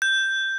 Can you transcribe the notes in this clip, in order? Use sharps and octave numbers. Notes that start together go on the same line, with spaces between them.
G6